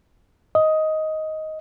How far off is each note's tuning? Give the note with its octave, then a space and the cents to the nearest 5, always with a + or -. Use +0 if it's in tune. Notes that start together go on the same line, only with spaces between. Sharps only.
D#5 +10